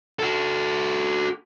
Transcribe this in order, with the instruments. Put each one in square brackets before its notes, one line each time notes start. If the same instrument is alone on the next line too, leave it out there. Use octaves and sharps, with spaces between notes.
[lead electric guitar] F#4 A4